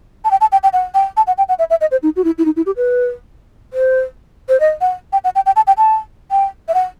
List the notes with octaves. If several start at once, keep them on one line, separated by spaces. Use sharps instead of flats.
A5
G5
A5
G5
G5
F#5
G5
A5
F#5
G5
F#5
E5
E5
D#5
C5
D#4
F#4
E4
E4
D#4
E4
G4
B4
C5
C5
D#5
F#5
G5
F#5
G5
G5
A5
G5
A5
G5
E5
F#5